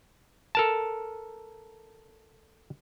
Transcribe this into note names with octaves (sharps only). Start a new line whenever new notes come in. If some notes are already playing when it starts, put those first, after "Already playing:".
A4 A#4 A5